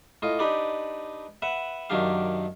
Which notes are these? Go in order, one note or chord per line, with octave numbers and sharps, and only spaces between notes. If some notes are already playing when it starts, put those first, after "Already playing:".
A2 F4 D#5
D4 D#4 G4 B4 D5
B4 E5 F#5
F#2 D#3 F#3 D4 G4 F5